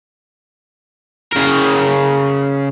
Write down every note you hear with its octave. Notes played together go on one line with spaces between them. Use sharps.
C#3 A#4